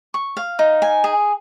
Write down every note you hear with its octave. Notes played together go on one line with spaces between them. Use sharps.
C#6
F5
D#4
G#5
G#4